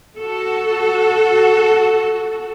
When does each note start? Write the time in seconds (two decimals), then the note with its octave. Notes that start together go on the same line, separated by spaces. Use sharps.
0.17 F#4 A4